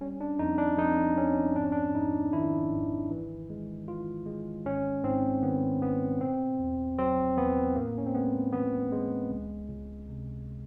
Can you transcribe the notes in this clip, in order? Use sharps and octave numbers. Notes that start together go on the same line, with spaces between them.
G3 C#4
D4
F2 D#4
D4
F2 D#4
F2 C#4
G#2 D4
C#4
D4
G#2 D#4
D#3 E4
G#1
E3
G#3
E3 F4
G#3
G#1 C#4
G#2 C4
D#3 B3
G#2 B3
B2 C4
E2
F#3 C4
E2 B3
A2 A#3
C#4
C4
G#3 B3
E3 B3
G#3
C#2
C#2
C3